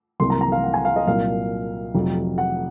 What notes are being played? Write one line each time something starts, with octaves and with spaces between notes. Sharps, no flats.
C2 C3 F#3 A#3 C6
A#5
A#5
F5
F#5
G#5
F5
D#5
C2 A#2 F#3 F5
F1 F2 C3 F#3
F#5